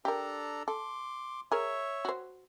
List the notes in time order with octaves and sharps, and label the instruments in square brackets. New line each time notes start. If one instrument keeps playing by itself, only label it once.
[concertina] D4 A4 A#5 [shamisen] G4 A#4
[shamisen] A4 [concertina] C6 D6
[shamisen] G#4 A#4 [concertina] C#5 E5
[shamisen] F#4 C5